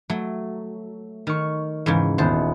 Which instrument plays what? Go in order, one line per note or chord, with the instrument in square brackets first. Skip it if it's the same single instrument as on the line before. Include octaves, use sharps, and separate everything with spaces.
[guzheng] F#3 [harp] A3
[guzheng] D#3 [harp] C#6 F6
[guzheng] E2 G#2 C#3
[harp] D#1 B3 [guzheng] C5 A5